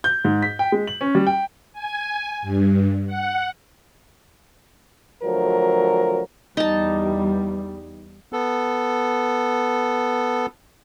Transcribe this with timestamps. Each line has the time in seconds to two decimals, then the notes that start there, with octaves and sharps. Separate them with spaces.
0.04 G6
0.24 G#2
0.42 B6
0.59 G5
0.72 G#3
0.87 F#7
1.01 C#4
1.15 G3
1.27 G5
1.73 G#5
2.42 G2
3.06 F#5
5.23 D2 F3 F#3 A#4
6.57 E2 G3 D#4 A5
8.33 B3 A4